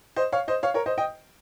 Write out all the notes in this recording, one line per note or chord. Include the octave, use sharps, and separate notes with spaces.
C5 D#5
C#5 F5
C5 D#5
C#5 F5
A#4 C#5
C5 D#5
D#5 G5